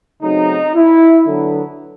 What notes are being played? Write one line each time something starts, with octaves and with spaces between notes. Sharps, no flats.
C#3 F#3 A3 C4 D#4
E4
D3 F#3 B3